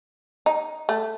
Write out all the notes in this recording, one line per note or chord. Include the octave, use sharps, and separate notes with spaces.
D#4
A3